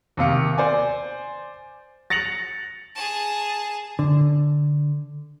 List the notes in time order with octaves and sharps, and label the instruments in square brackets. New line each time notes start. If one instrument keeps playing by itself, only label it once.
[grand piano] D#2 C3 F5 C#7
C5 D5 G#5
A6 A#6 C#7 F7 F#7
[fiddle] G#4 A5
[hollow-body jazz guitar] D3